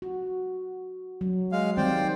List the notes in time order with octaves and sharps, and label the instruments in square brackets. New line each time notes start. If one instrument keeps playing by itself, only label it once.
[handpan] F#4
F#3
[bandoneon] G#3 F5
[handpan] D#3 G3 C4 [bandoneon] C5 D5 G5